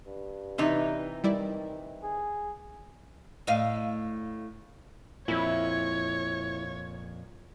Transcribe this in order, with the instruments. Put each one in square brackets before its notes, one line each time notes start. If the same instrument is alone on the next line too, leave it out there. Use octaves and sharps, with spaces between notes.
[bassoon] G2
[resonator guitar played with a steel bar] C3 E3 D#4
[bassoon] D#3 [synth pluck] G3 E4 D5
[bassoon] G#4
[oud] A2 D#5 F5
[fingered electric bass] F2 A#2 [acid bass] E4 [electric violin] C#5